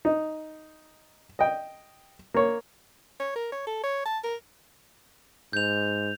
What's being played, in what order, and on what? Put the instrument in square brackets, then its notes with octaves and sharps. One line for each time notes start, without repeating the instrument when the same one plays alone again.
[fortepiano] D#4
D#5 G5
A#3 C#5
[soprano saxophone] C#5
A#4
C#5
A4
C#5
A5
A#4
[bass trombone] G#2 [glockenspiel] G6 F7